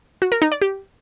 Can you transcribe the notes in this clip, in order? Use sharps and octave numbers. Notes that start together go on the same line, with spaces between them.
F#4
A#4
D#4
D5
G4